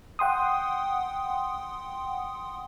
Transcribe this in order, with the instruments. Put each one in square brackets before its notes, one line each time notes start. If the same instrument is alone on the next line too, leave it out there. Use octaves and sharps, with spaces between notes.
[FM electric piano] F#5 G5 C6 D#6